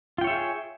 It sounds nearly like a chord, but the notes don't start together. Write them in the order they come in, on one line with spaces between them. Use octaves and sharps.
F4 G5 C#5 E5 G#4